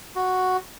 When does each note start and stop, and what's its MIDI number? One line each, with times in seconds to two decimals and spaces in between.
0.15 0.57 66